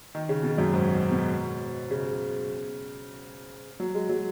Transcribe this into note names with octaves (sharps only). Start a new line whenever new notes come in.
D#3
C#3
B2
F#2
G#2
B2
B2
C#3
F#3
G#3
F#3